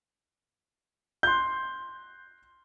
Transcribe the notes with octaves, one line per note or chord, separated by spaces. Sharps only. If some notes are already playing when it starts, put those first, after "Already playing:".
C6 F#6 G6